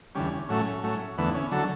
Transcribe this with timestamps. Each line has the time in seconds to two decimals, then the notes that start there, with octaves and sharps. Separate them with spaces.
0.15 E2 D3 G3 C#4
0.49 A2 F#3 A3 C#4
0.83 A2 F#3 A3
1.18 E2 D3 A3 B3
1.34 C#4
1.52 D3 F#3 A4